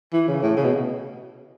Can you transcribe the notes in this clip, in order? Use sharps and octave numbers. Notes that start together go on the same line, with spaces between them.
E3
C#3
A2
C#3
B2